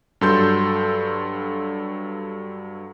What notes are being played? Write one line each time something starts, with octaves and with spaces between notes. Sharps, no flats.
G2 F#3 A4 C6 G6